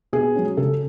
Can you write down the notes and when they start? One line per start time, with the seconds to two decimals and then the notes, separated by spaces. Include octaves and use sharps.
0.13 B2 G#4
0.35 F#3 C#4
0.57 C#3 A4